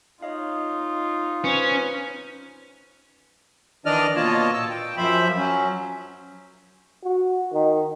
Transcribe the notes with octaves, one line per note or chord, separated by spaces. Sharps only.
D#4 F4 C#5 D#5 F5
C#4 B4 C5
D#3 E3 D4 D5 D#5 F6
B2 A#3 F4 C#5 D#5 A5
A#2 A5 E6
G5
F#2 F3 C5 E5 B5
F#3 C#4
F#4
D#3